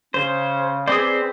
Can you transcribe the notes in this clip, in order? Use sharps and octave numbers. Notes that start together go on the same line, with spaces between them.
C#3 C#4 C5
C4 G#4 B4 C5 D5